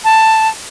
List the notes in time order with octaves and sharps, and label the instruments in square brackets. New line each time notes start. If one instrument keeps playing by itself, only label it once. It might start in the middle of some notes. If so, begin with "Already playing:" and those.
[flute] A5